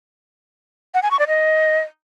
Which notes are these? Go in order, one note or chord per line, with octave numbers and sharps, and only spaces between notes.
F#5
G#5
C#6
D5
D#5